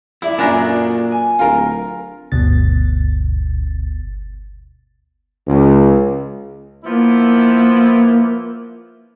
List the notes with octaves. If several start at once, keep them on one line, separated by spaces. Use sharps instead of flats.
F2 E4 D5
F#2 A#2 D4 E5 G#5 A#5
F#4 G4 A4
G#5
D1 F4 A#4
G1 D2 B2 A6
C#2
F3 A#3 B3 E4